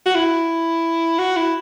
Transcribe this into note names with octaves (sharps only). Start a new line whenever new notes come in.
F#4
E4
F#4
E4